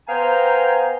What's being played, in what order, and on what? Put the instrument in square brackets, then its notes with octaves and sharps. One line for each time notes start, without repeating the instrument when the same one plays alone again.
[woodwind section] B3 C5 F5 G5 G#5 A#5